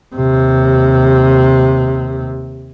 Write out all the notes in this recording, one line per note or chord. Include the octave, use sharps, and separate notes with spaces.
D#2 C3